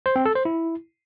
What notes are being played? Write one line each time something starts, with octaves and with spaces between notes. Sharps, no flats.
C5
C4
A4
C5
E4